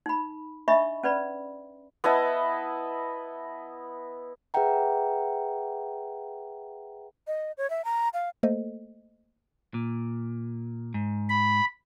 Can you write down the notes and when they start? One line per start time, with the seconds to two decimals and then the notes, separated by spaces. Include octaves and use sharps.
0.06 D#4 B5
0.68 D4 D#5 E5 B5 C#6
1.04 C#4 B4 D5 B5
2.04 B3 E4 D#5 A5
4.54 G#4 B4 E5 F#5 G5 A#5
7.27 D#5
7.58 C#5
7.70 E5
7.85 A#5
8.14 F5
8.43 A3 A#3 A4 C5 D#5
9.74 A#2
10.94 G#2
11.29 B5